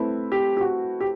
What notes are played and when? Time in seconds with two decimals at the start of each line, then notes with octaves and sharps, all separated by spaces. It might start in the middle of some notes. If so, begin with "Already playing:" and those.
Already playing: A3 C4 E4 B4
0.32 G4
0.57 G4
0.61 F#4
1.01 G4